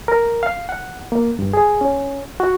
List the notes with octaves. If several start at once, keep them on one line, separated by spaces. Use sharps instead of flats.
A#4
F5
F#5
A#3
G2
G#4
C#4
F#4